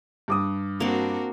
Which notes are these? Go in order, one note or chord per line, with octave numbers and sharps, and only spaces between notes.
G2 D6 D#6
A#3 C4 D4 F#4 A#4